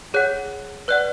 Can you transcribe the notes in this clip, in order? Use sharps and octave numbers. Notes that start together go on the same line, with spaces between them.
G#4 C#5 F#5 F#6
B4 D5 F#5 F#6